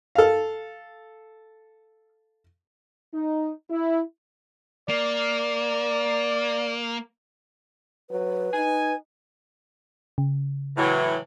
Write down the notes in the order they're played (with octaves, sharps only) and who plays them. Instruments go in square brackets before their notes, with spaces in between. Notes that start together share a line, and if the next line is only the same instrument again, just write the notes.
[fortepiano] A4 F5
[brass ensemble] D#4
E4
[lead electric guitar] A#3 [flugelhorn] D5
[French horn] F#3 [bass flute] B4
[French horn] D#4 [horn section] G#5
[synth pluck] C#3
[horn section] A2 E3 F#3